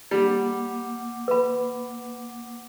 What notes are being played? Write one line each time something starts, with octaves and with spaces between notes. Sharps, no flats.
G3 A#3 F#5 D6
B4 B5